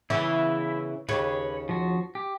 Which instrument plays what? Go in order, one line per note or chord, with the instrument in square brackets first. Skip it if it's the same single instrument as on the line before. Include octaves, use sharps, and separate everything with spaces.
[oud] C#3 E3 B3 [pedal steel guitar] E4 E5
[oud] D#2 C#3 [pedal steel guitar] B4 C#5
[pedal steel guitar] F3 F#4
G4